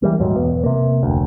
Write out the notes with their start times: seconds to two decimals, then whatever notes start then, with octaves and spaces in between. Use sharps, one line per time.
0.02 E3 G3 A#3
0.20 D#1 G#2 F#3
0.36 B1 E2 B3
0.64 C3 A#3
1.03 F1 D2